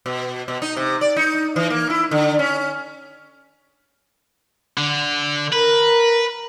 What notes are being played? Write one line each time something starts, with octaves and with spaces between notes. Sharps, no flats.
B2
B2
D#4
C3
D5
D#4
E3
A#3
E4
D3
C#4
D3
A#4 B4